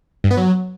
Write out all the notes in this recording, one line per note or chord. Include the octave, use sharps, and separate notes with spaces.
G2
B3
F#3